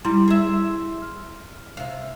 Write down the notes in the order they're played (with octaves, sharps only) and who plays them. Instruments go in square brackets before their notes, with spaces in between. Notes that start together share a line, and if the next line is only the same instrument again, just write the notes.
[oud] G3 [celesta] E4 C6
[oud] G#4 E5
[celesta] F6
[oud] C3 F5